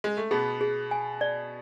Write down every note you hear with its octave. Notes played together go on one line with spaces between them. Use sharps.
G#3
A3
B2 B3 G#4
G#4
G#5
D5